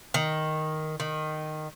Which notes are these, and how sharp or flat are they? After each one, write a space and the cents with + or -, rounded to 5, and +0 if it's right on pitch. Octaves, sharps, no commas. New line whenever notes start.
D#3 +0
D#3 -10